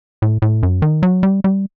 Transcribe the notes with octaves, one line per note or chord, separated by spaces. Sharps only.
A2
A2
F#2
D#3
F#3
G3
G3